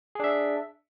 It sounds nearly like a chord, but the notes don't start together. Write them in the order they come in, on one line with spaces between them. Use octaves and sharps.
G#4 D4 E5